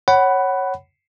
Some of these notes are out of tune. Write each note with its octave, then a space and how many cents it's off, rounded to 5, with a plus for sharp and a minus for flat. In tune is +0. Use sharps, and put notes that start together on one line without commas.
C#5 -10 F#5 +20 B5 +0